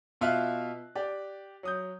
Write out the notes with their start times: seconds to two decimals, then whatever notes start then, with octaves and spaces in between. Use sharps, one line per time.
0.21 B2 F4 E5 F5 E6 F#6
0.95 G4 D5
1.63 F#3 D#6 G6